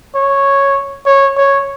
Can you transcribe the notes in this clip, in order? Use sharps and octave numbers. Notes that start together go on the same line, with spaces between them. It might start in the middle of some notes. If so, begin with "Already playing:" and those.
C#5
C#5
C#5